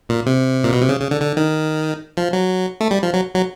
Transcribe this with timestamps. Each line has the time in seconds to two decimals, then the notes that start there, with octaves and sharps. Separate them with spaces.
0.09 A#2
0.26 C3
0.64 A#2
0.72 B2
0.81 C3
0.89 C#3
1.00 C#3
1.11 D3
1.22 D3
1.37 D#3
2.17 F3
2.33 F#3
2.81 A3
2.91 G3
3.03 F3
3.13 F#3
3.35 F#3